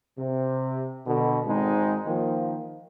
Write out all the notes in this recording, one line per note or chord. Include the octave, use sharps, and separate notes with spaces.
C3
B2 D3
G#1 G#3 C4 D#4
D#3 F3 A#3